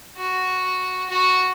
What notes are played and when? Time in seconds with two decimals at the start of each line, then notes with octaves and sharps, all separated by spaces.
0.17 F#4
1.09 F#4